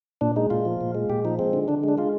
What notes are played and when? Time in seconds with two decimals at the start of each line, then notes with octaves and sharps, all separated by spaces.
0.21 A#2 D4
0.36 G#3 D#4
0.50 A#2 F4
0.65 F3
0.81 A#2
0.95 G#3
1.10 A#2 G4
1.25 F3 D#4
1.39 G#3 C4
1.53 D3
1.68 D3 D4
1.84 G#3 D4
1.98 G#3 F4